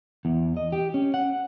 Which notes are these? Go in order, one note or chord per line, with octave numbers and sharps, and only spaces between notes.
E2
D#5
G4
C#4
F#5